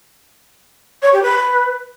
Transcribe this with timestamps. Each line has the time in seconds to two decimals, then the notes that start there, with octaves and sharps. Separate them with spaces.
1.02 C#5
1.12 G4
1.22 B4